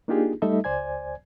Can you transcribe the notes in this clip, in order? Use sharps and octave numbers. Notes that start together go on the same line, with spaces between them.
A#3 D4 D#4 F4 G4 G#4
G3 A3 D#4 A4 D#5 E5
C#2 C5 D5 G#5 G#6